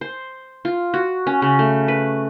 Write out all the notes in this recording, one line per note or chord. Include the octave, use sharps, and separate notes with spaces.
C5
F4
F#4
C#4
C#3
A3
B4